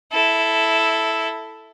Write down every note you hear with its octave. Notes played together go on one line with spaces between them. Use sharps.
E4 A4